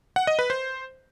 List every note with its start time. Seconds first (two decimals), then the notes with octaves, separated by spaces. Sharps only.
0.16 F#5
0.27 D#5
0.39 B4
0.50 C5